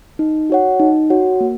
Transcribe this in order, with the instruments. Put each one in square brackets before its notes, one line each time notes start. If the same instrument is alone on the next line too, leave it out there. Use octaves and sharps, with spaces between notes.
[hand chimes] D#4
F#4 C#5 F#5
D#4
F#4 C#5 F#5
A#3